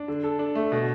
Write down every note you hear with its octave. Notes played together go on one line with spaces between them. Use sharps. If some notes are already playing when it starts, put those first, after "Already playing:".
Already playing: D4
D3
A4
D4
A3
B2